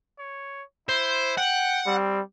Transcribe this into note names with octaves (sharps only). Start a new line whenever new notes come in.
C#5
E4 C5
F#5 G5
G3 C4